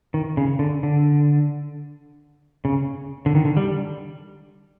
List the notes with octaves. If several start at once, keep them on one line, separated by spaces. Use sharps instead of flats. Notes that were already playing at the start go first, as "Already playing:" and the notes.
D#3
C#3
D3
D3
C#3
D3
D#3
D3
G3